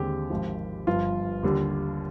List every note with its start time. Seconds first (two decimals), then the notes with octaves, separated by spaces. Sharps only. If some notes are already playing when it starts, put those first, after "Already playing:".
Already playing: D#2 D3 G#3 C4 G4
0.30 G#1 G#2 F3
0.87 G1 G2 F3 F4
1.43 D#2 D3 G3